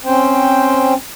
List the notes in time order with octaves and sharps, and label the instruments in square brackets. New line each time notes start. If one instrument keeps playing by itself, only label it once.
[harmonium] C4 C#4 C5 G5